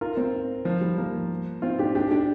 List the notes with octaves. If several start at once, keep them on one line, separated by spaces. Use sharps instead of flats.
F4 A#4
C4 F4
F3
G3
F3 A#3
C4 F4
D4 G4
D4 G4
D4 G4